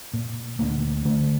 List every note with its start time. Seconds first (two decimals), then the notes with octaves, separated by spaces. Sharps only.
0.13 A#2
0.59 D2 A#3
1.05 D3 A3